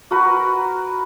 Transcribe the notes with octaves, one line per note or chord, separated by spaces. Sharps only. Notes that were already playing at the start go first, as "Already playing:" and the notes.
F#4 A#4 B4